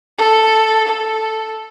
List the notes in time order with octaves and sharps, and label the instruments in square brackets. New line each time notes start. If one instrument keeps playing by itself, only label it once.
[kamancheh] A4
A4